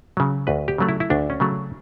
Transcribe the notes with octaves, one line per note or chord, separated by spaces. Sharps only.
C#3 F#3
D2 B4
G4
C#3 F#3 A3
E4
E4
D2 D4
C#4
C#3 F#3 A3